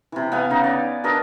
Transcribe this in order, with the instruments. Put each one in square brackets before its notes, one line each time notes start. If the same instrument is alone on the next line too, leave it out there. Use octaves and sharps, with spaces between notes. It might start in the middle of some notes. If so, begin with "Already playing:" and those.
[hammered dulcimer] C3 E3
B3 F5 G#5
C#3 D#4
D5
D4 A#4 B4 D#5